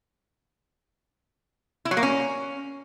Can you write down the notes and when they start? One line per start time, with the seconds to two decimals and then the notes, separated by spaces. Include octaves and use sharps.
1.85 E4
1.91 F#3
1.97 A#3
2.03 C#4